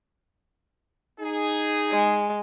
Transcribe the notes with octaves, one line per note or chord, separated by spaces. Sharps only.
D#4 G#4
G#3